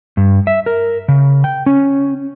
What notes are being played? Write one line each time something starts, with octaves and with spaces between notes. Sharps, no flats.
G2
E5
A#4
C#3
G5
C#4